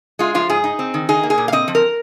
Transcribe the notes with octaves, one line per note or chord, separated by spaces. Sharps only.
G#3 F4
F3 F4
G#2 G#4
D#4
C4
D#3
D#4 G#4
A#3
G#4
A#2
F5
C4 D#5
F3
A#4